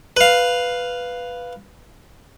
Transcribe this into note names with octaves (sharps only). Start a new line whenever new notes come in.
B4 F5